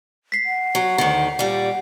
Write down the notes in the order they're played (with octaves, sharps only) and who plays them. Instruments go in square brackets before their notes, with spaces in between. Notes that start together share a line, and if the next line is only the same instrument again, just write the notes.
[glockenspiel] B6 C7
[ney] F#5
[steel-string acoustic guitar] F#3
D2 D#3
A#2 G3